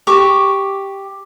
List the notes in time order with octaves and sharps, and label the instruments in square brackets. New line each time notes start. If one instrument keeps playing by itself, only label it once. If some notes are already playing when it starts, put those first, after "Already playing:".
[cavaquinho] G4 C#6 D6